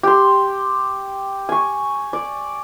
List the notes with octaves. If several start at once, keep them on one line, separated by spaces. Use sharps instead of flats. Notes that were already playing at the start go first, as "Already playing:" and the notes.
G4 C6
G#5 C#6
D5